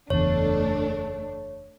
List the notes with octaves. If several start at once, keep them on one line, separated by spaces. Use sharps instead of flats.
F#1 E2 A3 D4 C#5